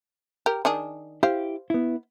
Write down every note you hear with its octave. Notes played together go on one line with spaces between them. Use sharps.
G4 A#4
D#3 D4 G#4
E4 G4 C5 F5
B3 E4